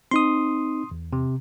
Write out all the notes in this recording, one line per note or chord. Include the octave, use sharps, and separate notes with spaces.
C4 D#4 C6 D#6
E2
C3